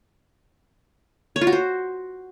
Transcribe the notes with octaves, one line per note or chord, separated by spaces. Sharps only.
C#5
F4
F#4
C5